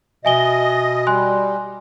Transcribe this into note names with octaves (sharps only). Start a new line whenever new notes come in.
B2 D#5 E5 G#5 G7
G3 G#5 C6 F#6